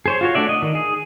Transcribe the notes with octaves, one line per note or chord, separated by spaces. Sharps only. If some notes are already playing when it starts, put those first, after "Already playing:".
G#4 C5 C#5
F4 F#4 C#5
A3 D4 F#4 D5 E5
D#5
D#3
G#4